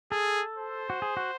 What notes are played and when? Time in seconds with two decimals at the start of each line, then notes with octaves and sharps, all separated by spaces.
0.12 G#4 A4
0.57 C5
0.90 F#4
1.02 G#4
1.17 F#4